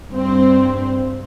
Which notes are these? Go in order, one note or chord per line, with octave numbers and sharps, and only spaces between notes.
G2 C4